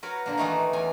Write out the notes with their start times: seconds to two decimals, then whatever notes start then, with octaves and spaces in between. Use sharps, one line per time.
0.03 F#4 A#4 B4 C#5
0.26 A#2 D3 A#3
0.37 D#3 E3 A3 D#4 B4
0.73 E2 C#4 G#5 A#5